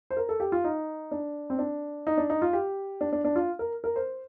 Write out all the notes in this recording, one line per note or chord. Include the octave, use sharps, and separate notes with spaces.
C5
A#4
A4
G4
F4
D#4
D4
C4
D4
D#4
D4
D#4
F4
G4
D4
D4
D4
F4
A#4
A#4
C5